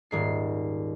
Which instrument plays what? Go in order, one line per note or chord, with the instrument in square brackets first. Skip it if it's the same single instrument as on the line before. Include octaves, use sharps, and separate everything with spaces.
[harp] D#1 G#2 C7